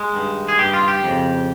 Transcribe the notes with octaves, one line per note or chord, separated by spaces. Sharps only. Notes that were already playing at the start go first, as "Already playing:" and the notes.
Already playing: G#3
G2 D#3
G#4
G2 D#3 G4
F4
G4
F2 C#3